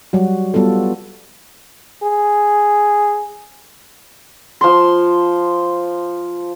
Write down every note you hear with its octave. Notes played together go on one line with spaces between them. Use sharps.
F#3 G3 F#4
G3 B3 F4 F#4 A4
G#4
F3 C6